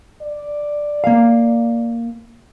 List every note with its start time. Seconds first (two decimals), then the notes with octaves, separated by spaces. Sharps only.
0.22 D5
1.04 A#3 F5